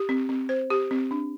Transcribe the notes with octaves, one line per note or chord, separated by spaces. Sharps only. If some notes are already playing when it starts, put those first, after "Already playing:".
Already playing: G4
C4
C4
C5
G4
C4
D4